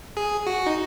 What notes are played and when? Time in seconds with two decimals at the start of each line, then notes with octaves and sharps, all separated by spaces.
0.17 G#4
0.47 F#4
0.66 D#4